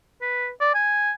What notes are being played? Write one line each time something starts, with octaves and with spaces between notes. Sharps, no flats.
B4
D5
G#5